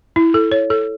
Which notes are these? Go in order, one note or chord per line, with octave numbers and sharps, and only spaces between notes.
E4
A4
C#5
A4